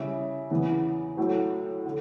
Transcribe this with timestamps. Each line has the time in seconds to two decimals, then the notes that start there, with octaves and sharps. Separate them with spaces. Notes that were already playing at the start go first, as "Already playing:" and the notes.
Already playing: C#3 G3 C#4 E4
0.50 E2 C#3 E3 B3
1.17 A2 F#3 A3
1.85 D3